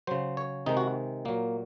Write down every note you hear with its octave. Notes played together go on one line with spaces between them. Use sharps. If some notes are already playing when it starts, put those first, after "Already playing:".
C#3 F#3 C5
C#5
C3 D#3 G#3 D#4
F#4
A#2 F#3 A#3